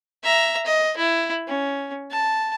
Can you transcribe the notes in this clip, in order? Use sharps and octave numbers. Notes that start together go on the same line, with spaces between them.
E5 A#5
D#5
E4
C#4
A5